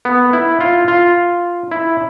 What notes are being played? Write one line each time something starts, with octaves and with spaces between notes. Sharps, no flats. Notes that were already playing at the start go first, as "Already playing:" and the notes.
B3
E4
F4
F4
E4